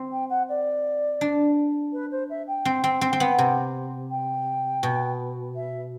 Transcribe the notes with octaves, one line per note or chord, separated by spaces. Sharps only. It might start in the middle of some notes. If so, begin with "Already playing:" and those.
Already playing: C4
G5
F#5
D5
D4
B4
C5
E5
G5
C4
C4
C4
C4
B3
C3
G5
B2
E5